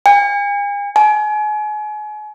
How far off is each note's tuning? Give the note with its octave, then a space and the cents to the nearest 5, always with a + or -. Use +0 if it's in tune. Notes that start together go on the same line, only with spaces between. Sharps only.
G#5 -40
G#5 +35